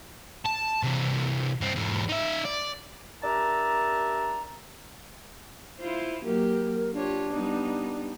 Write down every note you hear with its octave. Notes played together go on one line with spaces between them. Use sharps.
A5
C3 E3
G2 C4
E2 G#2
D#4 E5
D5
D4 G4 A#4 E5 A5 A#5
E4 F4 C5
F#3 A#3 G4 A#4
D4 F4 G4 C#5
G3 B3 D#4